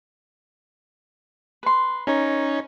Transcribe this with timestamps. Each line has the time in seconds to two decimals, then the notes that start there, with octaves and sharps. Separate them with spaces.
1.63 B4 C6
2.07 C#4 D#4 A#4 C#5